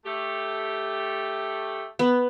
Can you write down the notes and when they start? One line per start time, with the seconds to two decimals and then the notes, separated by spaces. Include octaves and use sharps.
0.04 A3 G4
1.99 B3